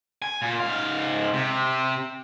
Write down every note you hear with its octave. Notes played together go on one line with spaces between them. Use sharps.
G#5
A#2
G#2 F5
C3